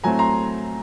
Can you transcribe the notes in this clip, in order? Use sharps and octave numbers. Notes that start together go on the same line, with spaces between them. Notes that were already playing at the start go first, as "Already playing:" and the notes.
A2 F#3 A3 C4 G#5 A#5
A#5 C6